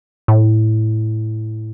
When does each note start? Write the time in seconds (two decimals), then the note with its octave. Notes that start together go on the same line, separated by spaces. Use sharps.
0.28 A2